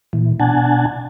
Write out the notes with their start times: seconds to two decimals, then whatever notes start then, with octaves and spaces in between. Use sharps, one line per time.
0.13 A#2 E3
0.40 B2 D4 F#5 G#5 A5